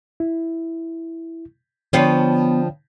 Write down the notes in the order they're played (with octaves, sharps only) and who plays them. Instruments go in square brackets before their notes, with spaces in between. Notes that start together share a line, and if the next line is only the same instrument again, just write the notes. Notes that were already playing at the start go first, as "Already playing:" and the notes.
[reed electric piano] E4
[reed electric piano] D3 G5 [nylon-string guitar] F3 D4 [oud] B3 C5 C#5